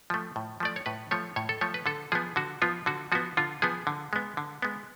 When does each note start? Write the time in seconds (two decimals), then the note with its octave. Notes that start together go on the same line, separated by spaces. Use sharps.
0.10 F3 A3
0.36 A2
0.60 F3 A3 D5
0.76 C#5
0.86 A2 B4
1.11 F3 A3 C#5
1.36 A2 C#5
1.49 A4
1.61 F3 A3 C#5
1.74 B4
1.86 D3 A4
2.12 F3 B3 G#4
2.36 D3 F#4
2.62 F3 B3 F4
2.86 D3 F#4
3.12 F3 B3 F#4
3.37 D3 F4
3.62 F3 B3 G#4
3.87 D3
4.13 G#3 B3
4.37 D3
4.62 G#3 B3